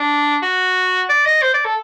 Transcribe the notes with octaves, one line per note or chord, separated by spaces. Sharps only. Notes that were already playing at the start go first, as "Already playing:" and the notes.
Already playing: D4
F#4
D5
D#5
C5
D5
A4